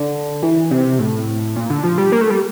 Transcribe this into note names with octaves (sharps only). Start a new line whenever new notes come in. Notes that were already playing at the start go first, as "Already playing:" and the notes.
Already playing: D3
E3
C3
A2
A#2
D3
F3
G3
A#3
A3
G3